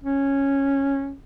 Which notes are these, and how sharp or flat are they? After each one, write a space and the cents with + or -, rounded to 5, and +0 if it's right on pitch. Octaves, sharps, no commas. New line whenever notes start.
C#4 -10